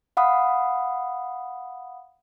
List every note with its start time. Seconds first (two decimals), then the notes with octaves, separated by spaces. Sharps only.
0.17 F5 F#5 B5 D#6